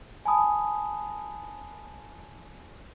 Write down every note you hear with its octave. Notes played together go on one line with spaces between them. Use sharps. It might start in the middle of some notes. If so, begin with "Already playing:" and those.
G#5 A5 B5 D#6